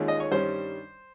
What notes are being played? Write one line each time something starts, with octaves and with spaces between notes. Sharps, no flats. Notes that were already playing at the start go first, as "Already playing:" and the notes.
Already playing: D#2 D#3 G#3 C#4 F4
D#5
C#5
G2 D#3 G3 C#4 C5